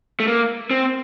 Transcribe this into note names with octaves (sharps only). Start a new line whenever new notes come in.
A3
A#3
C4